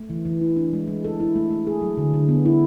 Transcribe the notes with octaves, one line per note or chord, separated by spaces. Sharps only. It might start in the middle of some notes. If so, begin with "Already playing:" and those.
Already playing: A3
E3
E3
E4
D4
G#3
G#3
A4
E4
A3
A3
G#4
F#3
D3
D3
B3
E4